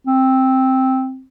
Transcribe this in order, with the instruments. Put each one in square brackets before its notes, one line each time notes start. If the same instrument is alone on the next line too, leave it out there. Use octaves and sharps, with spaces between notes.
[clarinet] C4